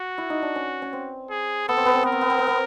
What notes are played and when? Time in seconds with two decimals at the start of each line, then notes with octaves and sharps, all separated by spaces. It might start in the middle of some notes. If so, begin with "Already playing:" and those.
Already playing: F#4
0.18 E4
0.30 D#4
0.42 D4
0.56 C#4
0.82 C#4
0.93 C4
1.30 G#4
1.69 B3 A4
1.77 C4
1.85 B3
1.94 C4
2.03 B3 A#4
2.12 C4
2.21 B3
2.30 C4
2.38 B3
2.47 C4